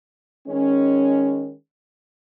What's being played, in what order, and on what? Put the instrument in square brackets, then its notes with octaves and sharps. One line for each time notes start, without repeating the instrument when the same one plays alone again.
[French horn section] D#3 G#3 C#4